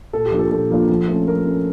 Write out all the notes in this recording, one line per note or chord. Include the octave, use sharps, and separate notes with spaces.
A#2 A4
G4
F3 A#3 D4 F4
A4
A#2 A4
F3 A#3 D4 F4
F3
A3 C#4
F3 A#4
A3 C#4